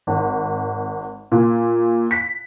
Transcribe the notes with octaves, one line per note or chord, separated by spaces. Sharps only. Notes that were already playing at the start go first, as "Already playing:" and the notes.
G#1
A#2
B6